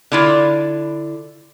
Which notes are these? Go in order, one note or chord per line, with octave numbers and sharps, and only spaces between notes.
D3 E4 F4